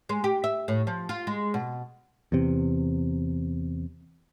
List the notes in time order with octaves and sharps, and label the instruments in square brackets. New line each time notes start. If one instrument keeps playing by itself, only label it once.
[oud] G#3
G4
E5
A2
F3
F4
G#3
B2
[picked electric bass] E2 C3